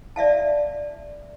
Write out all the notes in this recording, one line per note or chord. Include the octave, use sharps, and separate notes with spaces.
D5 E5 F5 A5